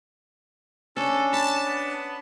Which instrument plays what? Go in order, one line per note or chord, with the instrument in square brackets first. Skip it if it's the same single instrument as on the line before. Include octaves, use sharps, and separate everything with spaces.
[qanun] C#4 [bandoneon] D4 [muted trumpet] A4
[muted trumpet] A5 [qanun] B5
[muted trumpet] B3